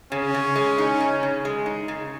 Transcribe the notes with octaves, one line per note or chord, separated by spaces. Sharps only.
C#3 C#4
C#3
G#3
D#4
C#3
C#3
G#3
D#4
C#3